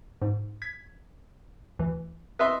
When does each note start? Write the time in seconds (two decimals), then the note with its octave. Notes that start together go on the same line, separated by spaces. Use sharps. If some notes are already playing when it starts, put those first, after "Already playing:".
0.22 G#2
0.62 G#6 B6
1.79 D2 E3
2.39 B4 D#5 E5 C6